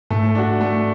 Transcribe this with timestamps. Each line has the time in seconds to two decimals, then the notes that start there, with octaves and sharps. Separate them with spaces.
0.10 G#2 A3
0.35 D4 F#4
0.61 A3